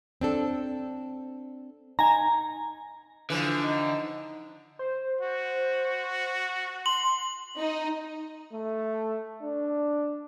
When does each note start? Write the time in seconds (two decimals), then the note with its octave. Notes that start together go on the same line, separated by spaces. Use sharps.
0.21 C4 D4 A4
1.99 D#4 G#5 A#5
3.30 D3 E3 F3
3.64 D#4
4.79 C5
5.21 F#4
6.86 C6 F#7
7.58 D#4
8.53 A3
9.42 D4